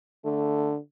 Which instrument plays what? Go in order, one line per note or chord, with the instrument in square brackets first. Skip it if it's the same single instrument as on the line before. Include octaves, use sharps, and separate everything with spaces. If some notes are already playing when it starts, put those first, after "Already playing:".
[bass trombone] D3 [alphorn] A3